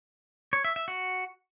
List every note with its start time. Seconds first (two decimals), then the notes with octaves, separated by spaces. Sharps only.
0.53 C#5
0.64 E5
0.76 E5
0.88 F#4